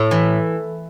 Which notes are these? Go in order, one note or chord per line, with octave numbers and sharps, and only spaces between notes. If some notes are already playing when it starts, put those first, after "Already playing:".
Already playing: A2 A4
E3